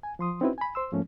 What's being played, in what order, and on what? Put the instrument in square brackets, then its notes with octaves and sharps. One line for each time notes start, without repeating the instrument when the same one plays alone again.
[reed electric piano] G#5
F3 C6 D#6
C4 C#4 D#4 E4 F#4 B4
G#5 B5
C5 C6 E6
G#2 F3 A3 A#3 C#4